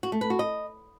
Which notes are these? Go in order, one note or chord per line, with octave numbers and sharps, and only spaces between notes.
F#4
A3
B4
F#4
D#5